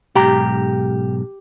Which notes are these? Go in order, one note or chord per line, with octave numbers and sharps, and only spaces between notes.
B1 G#2 G4 A#5